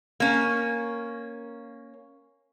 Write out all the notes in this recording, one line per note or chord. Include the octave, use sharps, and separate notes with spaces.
A#3 C#4